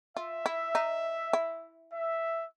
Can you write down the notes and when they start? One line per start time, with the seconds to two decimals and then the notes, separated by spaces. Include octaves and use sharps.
0.17 F4 E5
0.46 E4
0.75 D#4
1.33 E4
1.92 E5